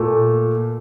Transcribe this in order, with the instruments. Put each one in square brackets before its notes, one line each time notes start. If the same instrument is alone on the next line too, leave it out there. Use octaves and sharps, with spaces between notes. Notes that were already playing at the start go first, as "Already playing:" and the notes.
Already playing: [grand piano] A#2 A3